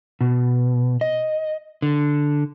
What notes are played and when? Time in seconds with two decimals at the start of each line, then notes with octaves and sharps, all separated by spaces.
0.21 B2
1.01 D#5
1.82 D3